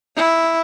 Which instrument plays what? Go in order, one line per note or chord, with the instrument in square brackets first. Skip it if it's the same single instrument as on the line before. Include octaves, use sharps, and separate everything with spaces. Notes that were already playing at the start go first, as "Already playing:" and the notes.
[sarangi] E4